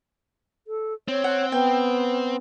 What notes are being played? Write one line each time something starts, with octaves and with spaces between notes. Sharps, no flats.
A4
C4 C#5
F#5
B3 G5